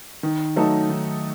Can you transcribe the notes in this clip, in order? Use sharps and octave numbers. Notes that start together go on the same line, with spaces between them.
D#3
F#3 A3 D#4 A4
D#3